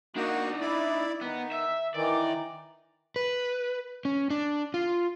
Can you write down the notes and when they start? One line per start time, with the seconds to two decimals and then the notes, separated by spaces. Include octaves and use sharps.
0.16 A#3 D4 D#4 F#4
0.61 E4 D5
1.21 D#3 B3
1.52 E5
1.94 D#3 E3 D5
3.16 B4
4.05 C#4
4.30 D4
4.74 F4